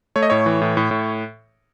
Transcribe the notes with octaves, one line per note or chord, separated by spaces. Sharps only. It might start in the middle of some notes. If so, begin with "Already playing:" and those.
A3 C#5
D#5
A2 C#5
E3
A2
A2
A2